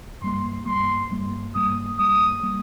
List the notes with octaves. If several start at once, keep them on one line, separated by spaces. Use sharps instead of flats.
G2 G3 A#3 C6
G2 G3 A#3 C6
G2 G3 A#3
G2 G3 A#3 D#6
G2 G3 A#3 D#6
G3 A#3